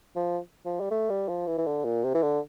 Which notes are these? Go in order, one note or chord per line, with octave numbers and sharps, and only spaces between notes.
F3
F3
G3
A3
G3
F3
E3
E3
D3
A#2
C3
E3
D3